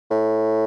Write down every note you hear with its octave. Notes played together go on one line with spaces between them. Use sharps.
A2